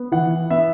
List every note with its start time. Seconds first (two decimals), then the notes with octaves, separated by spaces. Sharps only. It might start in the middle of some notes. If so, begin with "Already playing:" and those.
Already playing: B3
0.12 E3 F#5
0.51 B3 E5